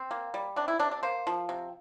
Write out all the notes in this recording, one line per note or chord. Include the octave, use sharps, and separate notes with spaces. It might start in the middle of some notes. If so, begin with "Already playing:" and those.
Already playing: C4
A#3
G3
C3 D4
E4
C3 D4
D4
A#3 C5
F3
C3